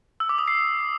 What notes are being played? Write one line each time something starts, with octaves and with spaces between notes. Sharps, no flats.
E6
D6
D#6
C7